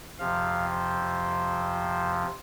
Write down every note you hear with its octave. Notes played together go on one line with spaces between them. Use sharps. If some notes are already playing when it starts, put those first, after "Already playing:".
F2 C3 F3 F5
C5